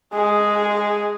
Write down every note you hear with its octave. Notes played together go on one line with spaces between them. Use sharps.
G#3 G#4